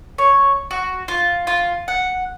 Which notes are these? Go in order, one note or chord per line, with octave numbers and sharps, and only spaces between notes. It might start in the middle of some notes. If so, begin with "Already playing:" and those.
C#5
F#4
F4
F4
F#5